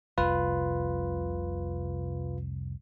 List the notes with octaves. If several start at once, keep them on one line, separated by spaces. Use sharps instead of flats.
F1 C2 F2 F4 B4